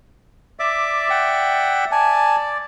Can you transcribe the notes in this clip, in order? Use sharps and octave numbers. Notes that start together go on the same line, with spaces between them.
D5 E5 D6
F#5 G5
D5 G#5 A5